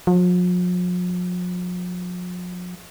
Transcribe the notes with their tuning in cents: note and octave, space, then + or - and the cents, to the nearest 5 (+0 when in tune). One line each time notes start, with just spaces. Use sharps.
F3 +45